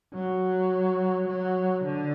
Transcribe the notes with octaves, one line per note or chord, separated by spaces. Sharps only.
F#3
F#3
D3